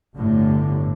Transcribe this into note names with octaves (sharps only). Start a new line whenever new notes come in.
G1 A2 D3